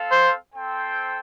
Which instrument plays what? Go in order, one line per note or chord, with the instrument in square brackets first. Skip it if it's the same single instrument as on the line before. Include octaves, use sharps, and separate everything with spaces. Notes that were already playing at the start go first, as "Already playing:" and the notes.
Already playing: [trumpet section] C4 A4 F5
[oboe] C5
[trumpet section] C4 A4 C5 G5